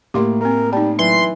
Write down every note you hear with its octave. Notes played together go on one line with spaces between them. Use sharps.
A2 A#3 G4 C6 D6
A3 C4 A#4
G3 D#4 A5
E3 F#3 C6